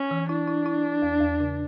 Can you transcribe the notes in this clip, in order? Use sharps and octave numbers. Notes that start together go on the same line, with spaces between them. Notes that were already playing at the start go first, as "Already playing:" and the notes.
Already playing: C#4
E3
D4 E4
E4
E4
E4
E2
E2
C#3